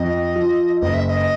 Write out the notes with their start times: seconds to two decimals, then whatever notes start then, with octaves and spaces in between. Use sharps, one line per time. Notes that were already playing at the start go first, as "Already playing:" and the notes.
Already playing: F2 D#5
0.36 F3
0.81 F#1 D#5
0.94 E5
1.05 E5
1.09 D#5